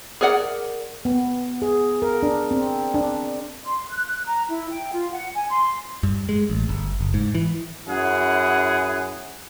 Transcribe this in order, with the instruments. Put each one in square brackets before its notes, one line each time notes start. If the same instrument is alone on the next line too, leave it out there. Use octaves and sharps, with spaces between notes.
[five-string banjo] G#4 A#4 D5 F#5
[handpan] B3
G#4
A#4
D4
C4
D4
[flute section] C6
F#6
F#6
A#5
E4
G5
F4
F#5
G#5
C6
[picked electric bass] G2
G#3
A1
G1
F#1
G#2
E3
[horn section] F#2 E4 G#4 F#5